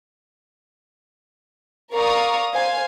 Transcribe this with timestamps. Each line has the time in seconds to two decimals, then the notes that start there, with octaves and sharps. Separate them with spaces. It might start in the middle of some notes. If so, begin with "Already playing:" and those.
1.94 A#4 D5 F5 A#5 C#6 D#6
2.53 C5 F5 G#5